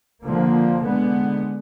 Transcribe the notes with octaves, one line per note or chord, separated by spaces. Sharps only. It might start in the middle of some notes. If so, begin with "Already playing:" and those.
D3 F3 A#3
D3 G#3 B3